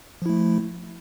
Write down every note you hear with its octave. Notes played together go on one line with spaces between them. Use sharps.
F3 A3 E4